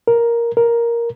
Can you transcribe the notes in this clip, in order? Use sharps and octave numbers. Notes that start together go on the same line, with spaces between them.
A#4
A#4